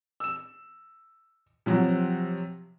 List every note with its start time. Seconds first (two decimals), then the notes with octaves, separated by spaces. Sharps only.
0.20 E6 E7
1.66 C3 F3 F#3 F#4